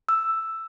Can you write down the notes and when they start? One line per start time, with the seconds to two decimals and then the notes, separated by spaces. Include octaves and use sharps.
0.09 E6